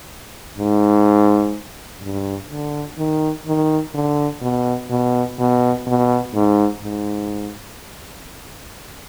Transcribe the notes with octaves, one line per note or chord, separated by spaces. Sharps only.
G#2
G2
D3
D#3
D#3
D3
B2
B2
B2
B2
G#2
G#2